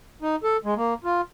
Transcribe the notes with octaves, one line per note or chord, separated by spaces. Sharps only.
D#4
A4
G#3
A#3
F4